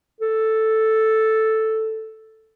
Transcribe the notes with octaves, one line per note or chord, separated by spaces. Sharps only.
A4